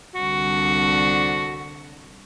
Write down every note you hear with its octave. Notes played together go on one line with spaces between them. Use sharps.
C2 D3 F#4